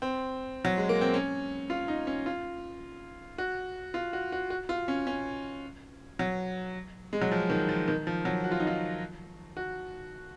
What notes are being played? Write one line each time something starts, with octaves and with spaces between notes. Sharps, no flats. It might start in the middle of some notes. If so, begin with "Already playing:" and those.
C4
F#3
G#3
A#3
C4
C#4
F4
D#4
C#4
F4
F#4
F4
F#4
F#4
F#4
F4
C#4
C#4
F#3
G#3
F#3
F3
D#3
F3
D#3
F3
F#3
F#4
F4
D#4
F4
F#4